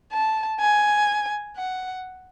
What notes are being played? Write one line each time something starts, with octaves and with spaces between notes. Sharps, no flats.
A5
G#5
F#5